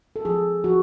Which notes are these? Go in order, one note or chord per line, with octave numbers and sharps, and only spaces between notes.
A4
F3 G#4
F3 F#4